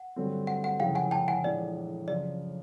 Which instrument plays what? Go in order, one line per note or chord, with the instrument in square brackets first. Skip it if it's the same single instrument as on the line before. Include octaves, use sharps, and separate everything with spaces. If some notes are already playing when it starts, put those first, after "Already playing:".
Already playing: [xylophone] F#5
[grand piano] G2 D3 F#3 A3 C4
[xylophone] F#5
F#5
[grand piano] F#1 F2 C#3 E3 G#3 [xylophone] F5 G5
[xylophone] F#5 G#5
G5 A5
F#5 G#5
[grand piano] A#1 A2 E3 G#3 [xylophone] D5
[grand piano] F#2 C#3 F3 [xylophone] D5